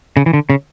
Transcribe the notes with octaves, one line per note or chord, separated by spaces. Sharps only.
C#3
E3
D3
C#3